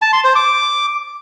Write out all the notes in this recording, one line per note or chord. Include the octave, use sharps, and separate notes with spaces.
A5
C6
C5
D6